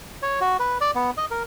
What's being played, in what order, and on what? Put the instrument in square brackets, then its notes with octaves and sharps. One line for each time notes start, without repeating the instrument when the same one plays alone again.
[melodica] C#5
F#4
B4
D5
B3
D#5
A#4